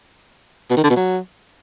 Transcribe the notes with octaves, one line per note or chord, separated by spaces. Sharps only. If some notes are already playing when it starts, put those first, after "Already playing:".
B2
D#3
D3
B2
F#3